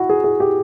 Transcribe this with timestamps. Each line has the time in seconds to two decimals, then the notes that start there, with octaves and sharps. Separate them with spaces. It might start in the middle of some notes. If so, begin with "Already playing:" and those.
Already playing: E4 F#4
0.10 G#4
0.24 G#4
0.40 G4